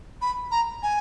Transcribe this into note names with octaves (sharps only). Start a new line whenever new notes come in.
B5
A#5
G#5